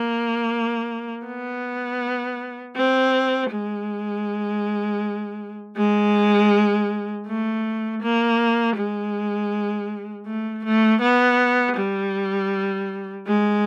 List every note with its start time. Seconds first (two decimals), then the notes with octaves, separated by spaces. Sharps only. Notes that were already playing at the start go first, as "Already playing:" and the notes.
Already playing: A#3
1.26 B3
2.76 C4
3.51 G#3
5.76 G#3
7.27 A3
8.02 A#3
8.76 G#3
10.27 A3
10.65 A3
11.01 B3
11.77 G3
13.27 G#3